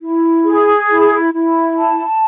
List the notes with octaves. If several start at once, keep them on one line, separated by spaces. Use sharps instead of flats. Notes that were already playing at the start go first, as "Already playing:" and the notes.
E4
G#4
E4
E4
A5